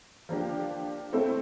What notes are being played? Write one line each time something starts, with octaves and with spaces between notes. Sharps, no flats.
F3 A#3 D4 G4
A3 C4 E4 A4